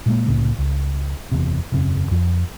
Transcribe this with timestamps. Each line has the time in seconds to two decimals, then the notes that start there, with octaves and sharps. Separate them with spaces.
0.06 A#2 G#3 A#3
0.27 C2 A2 C#3 A#3
0.58 C#2
1.32 F#1 E2 C3
1.72 E1 F#2 C#3 C4
2.11 F2 F3